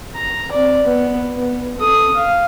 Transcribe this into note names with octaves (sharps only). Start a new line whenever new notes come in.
A#5
C4 D5
B3
B3
A4 D#6
F5